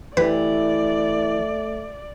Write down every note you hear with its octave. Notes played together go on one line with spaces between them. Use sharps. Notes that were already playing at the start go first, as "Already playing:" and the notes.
E3 A3 G4 B4 D5